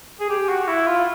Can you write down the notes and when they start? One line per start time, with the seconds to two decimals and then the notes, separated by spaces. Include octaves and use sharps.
0.20 G#4
0.30 G4
0.49 F#4
0.67 E4
0.86 F4